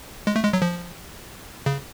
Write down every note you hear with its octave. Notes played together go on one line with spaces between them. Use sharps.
G#3
A3
G#3
F#3
F3
C#3